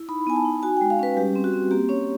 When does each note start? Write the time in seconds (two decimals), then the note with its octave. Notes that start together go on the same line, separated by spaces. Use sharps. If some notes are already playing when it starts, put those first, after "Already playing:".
Already playing: E4
0.09 D#4 B5
0.27 B3 G#5
0.36 A5
0.45 D#4
0.63 F#4 G#5
0.77 G5
0.81 G#3
0.90 F5
0.99 C#4 B4
1.17 G3 G4
1.36 C4
1.44 F#4
1.53 C4
1.71 A#3 G4
1.89 C#4 C#5